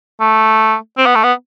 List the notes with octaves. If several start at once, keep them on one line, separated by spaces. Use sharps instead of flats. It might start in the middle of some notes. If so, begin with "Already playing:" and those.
A3
C4
B3
A3
B3